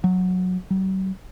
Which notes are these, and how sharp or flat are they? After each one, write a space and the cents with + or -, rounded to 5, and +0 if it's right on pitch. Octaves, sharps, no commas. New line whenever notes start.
F#3 -15
F#3 +45